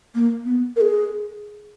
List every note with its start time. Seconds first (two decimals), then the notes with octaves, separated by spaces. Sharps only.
0.15 A#3
0.46 B3
0.76 A#4
0.81 G#4